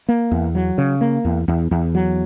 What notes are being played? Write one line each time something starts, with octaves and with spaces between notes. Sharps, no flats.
A#3
E2
F#3
C#3
A#3
E2
E2
E2
F#3